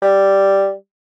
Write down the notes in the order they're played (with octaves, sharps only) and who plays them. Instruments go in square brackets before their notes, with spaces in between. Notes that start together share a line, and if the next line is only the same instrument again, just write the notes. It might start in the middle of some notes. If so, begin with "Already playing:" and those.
[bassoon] G3